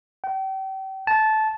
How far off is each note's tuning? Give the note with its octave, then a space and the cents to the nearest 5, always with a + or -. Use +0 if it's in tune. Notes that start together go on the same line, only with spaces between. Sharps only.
G5 -35
A5 -15